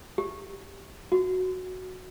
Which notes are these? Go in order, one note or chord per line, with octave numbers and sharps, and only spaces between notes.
G4
F#4